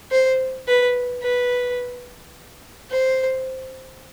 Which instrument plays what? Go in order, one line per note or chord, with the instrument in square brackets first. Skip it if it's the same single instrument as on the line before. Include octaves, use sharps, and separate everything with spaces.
[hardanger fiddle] C5
B4
B4
C5